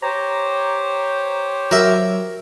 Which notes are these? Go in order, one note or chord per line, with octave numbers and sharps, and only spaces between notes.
G4 C5 C#5 A#5
F#3 A#4 E5